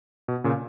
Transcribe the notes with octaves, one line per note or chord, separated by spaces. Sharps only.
B2
A#2 C#3